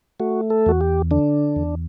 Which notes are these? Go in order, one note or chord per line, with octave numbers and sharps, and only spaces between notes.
A3 F#4
A4
E2 F#4
G4
D3 D4
E2